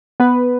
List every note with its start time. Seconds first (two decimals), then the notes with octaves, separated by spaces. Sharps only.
0.20 B3 B4